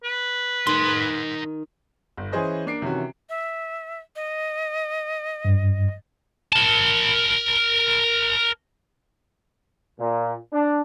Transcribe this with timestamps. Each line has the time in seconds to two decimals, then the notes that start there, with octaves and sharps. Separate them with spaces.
0.03 B4
0.67 D#3 D#4 C6
2.17 G1
2.32 E3 C#4 G#4 C5 D#5
2.66 A#3 D4 C7 D7
2.82 C3 D#3 E3 C#4 F#4
3.29 E5
4.16 D#5
5.45 G2
6.53 A#4 A5
10.00 A#2
10.52 D4